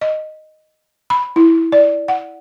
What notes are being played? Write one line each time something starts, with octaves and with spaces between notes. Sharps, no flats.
D#5
B5
E4
D5
F#5